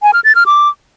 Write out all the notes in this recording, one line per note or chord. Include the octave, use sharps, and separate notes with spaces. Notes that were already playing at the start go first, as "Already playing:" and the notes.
G#5
F6
A6
F6
D6